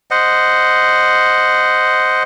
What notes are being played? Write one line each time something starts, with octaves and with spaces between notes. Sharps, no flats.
C5 D#5 F#5